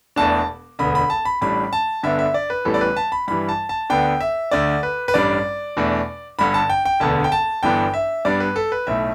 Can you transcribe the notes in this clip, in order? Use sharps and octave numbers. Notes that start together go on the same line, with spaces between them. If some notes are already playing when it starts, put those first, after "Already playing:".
E1 E2 B2 A3 D4 A5
E1 D2 D3 B3 B5
B5
A5
B5
A1 A2 G3 D4 B5
A5
G1 G2 D3 B3 D4 E5
E5
D5
B4
A1 A2 E3 G3 B3 A4
D5
B4
A5
B5
G2 E3 G3 B5
A5
A5
D2 D3 B3 D4 G5
E5
D2 D3 A3 D5
B4
B4
A1 G2 G3 D4 D5
E2 B2 A3 D4
G1 G2 D3 B5
A5
G5
G5
E1 D2 D3 B3 A5
G5
A5
G1 G2 E3 B3 D4 G5
E5
G2 G3 B3 D4 D5
B4
A4
B4
B1 A2 A3 E5